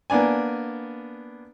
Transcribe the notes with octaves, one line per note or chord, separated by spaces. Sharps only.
A#3 B3 D4 D5 G#5